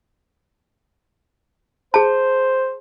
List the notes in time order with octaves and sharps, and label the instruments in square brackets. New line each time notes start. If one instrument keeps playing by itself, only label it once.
[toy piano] G#4 A5 [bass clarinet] C5